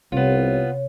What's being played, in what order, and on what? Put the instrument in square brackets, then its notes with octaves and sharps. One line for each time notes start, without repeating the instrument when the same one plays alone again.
[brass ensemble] C2 [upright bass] C3 [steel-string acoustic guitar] B3 F4 [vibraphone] C#5